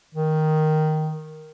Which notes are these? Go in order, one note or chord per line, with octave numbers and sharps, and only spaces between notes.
D#3